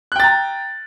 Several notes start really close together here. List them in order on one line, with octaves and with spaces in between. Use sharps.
F#6 G5 A6 A#5